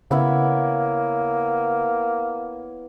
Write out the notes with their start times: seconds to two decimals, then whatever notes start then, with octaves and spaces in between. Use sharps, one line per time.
0.11 C#3 A#3 B3 E4 C#5